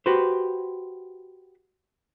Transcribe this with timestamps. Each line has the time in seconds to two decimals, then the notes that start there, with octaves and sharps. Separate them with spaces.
0.06 F#4 G4 B4 C5